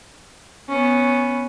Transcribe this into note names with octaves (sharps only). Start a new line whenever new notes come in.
B3 C#4